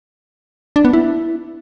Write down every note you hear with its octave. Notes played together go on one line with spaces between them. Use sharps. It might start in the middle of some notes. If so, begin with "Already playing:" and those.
D4
B3
E4